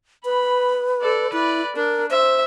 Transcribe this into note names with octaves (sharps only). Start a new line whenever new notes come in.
B4 B5
A4 D5
E4 B4 D5
D4 A#4
C5 E5